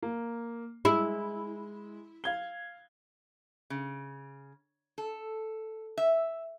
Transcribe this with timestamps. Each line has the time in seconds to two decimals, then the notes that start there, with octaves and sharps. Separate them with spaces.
0.03 A#3
0.85 G#3 E4
2.24 F5 G#6 G7
3.70 C#3
4.98 A4
5.98 E5